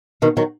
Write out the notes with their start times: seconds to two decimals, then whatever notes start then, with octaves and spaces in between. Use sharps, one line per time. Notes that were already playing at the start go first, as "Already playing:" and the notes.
0.22 B2 D#3
0.37 D#3 F#3